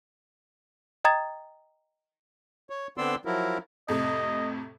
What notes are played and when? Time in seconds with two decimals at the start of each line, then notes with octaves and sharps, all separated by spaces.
1.04 D#5 G5 A#5 D#6 G#6 A6
2.70 C#5
2.98 D3 B3 C4 D5 C6 E6
3.25 F3 F#3 E4 A#4
3.88 F2 A2 C3 D#5